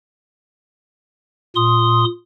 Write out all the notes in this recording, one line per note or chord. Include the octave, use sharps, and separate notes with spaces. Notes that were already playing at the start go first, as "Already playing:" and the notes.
A#2 C6 D#6